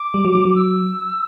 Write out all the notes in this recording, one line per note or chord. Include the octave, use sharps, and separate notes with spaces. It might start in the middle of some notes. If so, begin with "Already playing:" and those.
Already playing: D6
G3
F#3
F#3
F#3
E6